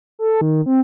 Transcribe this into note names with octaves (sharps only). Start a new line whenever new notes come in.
A4
D#3
C4